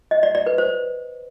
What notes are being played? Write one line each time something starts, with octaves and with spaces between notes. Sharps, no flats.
D#5
D5
D5
B4
C5